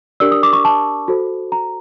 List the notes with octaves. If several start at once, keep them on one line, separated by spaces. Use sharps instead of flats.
D4 G4 A#4 D5 E6
D#6
D6
C#6
A5
F#4 A4 C5
A#5